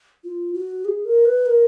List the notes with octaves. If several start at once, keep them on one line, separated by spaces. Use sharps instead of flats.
F4
F#4
G#4
A#4
B4
A#4